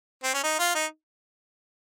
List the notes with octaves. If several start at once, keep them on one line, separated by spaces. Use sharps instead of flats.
C4
C#4
D#4
F4
D#4